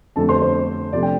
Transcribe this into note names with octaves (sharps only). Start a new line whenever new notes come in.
F2 D3 A3 A4 A5
C5 C6
C5
C3 F3 A3 D5
G5